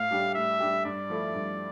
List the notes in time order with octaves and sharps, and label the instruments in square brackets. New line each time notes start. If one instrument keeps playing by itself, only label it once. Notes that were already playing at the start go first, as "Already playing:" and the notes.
Already playing: [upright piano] A2 [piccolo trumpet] F5
[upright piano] G3 D4 G4
[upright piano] A2 [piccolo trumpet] E5
[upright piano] G3 D4 G4
[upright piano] G2 [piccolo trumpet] D5
[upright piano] F3 A3 E4
G2